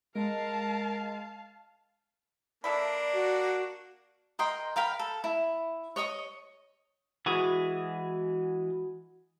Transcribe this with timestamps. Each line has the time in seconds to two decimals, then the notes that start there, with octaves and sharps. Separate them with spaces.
0.15 G#3 A#4 F5 A5
2.64 A#3 D4 A4 D5 E5 B5
3.13 F#4
4.39 A#4 D#5 G5 C6
4.76 A#4 F5 G5 B5
4.99 A4
5.24 E4
5.96 C#5 D#5 C#6 D#6
7.26 E3 G#3 F#4 G#4